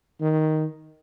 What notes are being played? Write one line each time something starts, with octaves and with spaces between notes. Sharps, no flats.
D#3